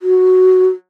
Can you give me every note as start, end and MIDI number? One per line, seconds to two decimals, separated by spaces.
0.02 0.67 66